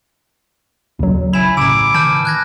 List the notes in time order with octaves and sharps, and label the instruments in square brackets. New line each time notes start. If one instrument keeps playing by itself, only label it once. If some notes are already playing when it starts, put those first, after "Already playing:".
[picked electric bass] A#1 C#3 [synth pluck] D#2 F#3
[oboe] E4 [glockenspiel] G#5 B5 [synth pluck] E7
[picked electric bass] A2 C#3 [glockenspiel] A#5 E6 [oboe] D6
[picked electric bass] D#3 E3 [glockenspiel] A5 F6 [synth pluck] G6
[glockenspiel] F#6 G#6 A#6